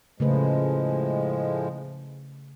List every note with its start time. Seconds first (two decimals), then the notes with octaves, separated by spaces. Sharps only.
0.20 A2 C#3 F3 G#3 A3 B4